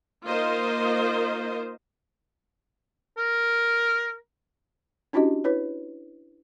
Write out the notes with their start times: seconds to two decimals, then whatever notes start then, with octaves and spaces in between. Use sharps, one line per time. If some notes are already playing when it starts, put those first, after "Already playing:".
0.24 A#3 D#4 F4 A#4 C5 D#5
3.17 A#4
5.13 C#4 D4 E4 F#4 G4 D#5
5.44 E4 B4 C#5